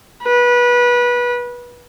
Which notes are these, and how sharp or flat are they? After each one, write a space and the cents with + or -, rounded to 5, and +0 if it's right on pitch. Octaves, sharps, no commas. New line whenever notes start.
B4 -25